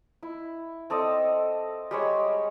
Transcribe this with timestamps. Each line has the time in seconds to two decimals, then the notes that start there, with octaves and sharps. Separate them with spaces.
0.23 E4
0.90 C4 A4 D5 D#5
1.91 G3 G#3 C#5